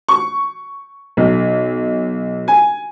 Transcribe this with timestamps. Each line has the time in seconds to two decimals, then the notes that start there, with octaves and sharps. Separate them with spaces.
0.09 C#6
1.17 B1
2.48 G#5